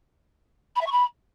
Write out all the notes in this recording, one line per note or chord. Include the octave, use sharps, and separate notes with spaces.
B5
E5
C#6
B5